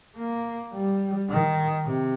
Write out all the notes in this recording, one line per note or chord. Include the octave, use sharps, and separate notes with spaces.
A#3
G3
D#3
C3